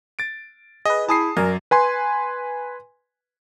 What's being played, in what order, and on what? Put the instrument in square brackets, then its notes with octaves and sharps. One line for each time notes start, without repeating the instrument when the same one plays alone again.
[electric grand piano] A6 D7
[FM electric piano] G#4 B4 [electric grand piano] D#5
[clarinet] E4 [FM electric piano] G#4 [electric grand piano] A5 D#6 C7
[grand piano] F#2 [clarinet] A#4 [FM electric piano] D5 G#5 A#5
[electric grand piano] B4 G#5 C6